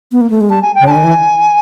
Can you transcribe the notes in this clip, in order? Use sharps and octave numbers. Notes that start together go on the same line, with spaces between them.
B3
A#3
A3
G#3
G3 A5
G#5
G5
C#3
D3 A5
D#3 G#5
E3